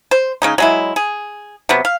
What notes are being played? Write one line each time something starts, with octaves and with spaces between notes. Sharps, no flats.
C5
C#3 G#3 D#4
F#3 G#3 E4
G#4
C3 F#3 B3
F5